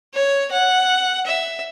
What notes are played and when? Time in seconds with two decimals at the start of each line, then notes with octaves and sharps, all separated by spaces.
0.14 C#5
0.51 F#5
1.26 E5